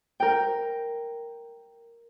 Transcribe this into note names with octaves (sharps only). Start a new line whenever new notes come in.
A#4 G5